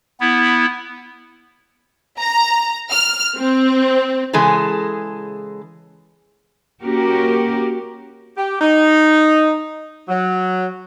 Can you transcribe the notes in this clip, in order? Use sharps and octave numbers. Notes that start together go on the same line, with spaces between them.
B3 E4
A#5
F6
C4
C#3 E3 G#3 G#4 A4
A#3 C#4 F#4 G4 A#4
G4
D#4
F#3